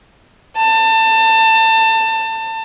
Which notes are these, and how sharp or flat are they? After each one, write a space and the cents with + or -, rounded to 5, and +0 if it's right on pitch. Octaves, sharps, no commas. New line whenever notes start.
A5 +25